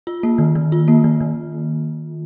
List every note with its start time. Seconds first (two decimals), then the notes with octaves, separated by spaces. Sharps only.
0.07 F4
0.23 A#3
0.38 D#3
0.55 D#3
0.72 F4
0.88 A#3
1.04 D#3
1.21 D#3